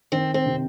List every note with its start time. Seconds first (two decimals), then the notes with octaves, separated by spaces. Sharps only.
0.12 D#3 C4
0.34 C4
0.46 C3